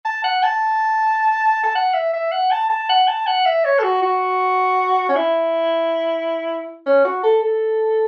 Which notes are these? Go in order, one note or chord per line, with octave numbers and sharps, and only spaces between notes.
A5
F#5
A5
A5
F#5
E5
E5
F#5
A5
A5
F#5
A5
F#5
E5
C#5
A4
F#4
F#4
C#4
E4
C#4
F#4
A4
A4